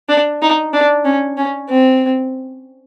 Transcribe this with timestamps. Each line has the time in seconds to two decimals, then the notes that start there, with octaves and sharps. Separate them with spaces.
0.09 D4
0.42 D#4
0.73 D4
1.05 C#4
1.37 C#4
1.69 C4